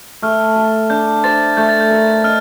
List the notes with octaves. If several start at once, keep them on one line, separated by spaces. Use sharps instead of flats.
A3 F6
A4
D4 G6
C5 A6
A3 G6
A6
G6
A#4
D#4 F6